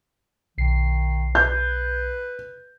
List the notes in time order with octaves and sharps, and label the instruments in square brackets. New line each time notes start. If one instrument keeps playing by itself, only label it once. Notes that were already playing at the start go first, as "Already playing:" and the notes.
[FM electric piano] B1 C7 [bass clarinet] D#3
[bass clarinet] B4 [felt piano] G6